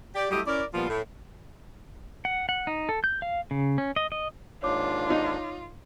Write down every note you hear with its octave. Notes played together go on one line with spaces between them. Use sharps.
G4 D5
F#3 G3 A3 E4 G4 D#5
C#4 E4 A#4 D5
A#2 F3 G3 B3 F4
A2
F#5
F#5
D#4
A4
G6
F5
C#3
C#4
D#5
D#5
D#2 G#2 D4 F4 C#5 D6
D#4